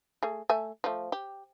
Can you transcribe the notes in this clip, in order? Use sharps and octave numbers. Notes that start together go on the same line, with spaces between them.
A3 G#4
A3 E5 G#5
F3 A3
G4